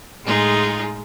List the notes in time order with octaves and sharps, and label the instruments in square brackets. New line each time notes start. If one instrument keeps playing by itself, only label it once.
[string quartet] A2 G#3 D#4 F4 G#4